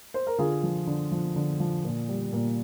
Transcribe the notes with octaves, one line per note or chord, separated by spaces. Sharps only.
C5
A#4
D3 F4 G#4
F3
D3
F3
D3
F3
A#2
G3
A#2